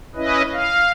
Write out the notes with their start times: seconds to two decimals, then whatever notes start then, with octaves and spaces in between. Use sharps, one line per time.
0.15 C#4 E4 B4 D#5
0.53 F5